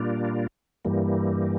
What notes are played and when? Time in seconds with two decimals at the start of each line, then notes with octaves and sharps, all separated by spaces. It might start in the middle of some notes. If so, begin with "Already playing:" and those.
Already playing: A#2 G3 A#3 D4 F4
0.85 G2 E3 G3 A#3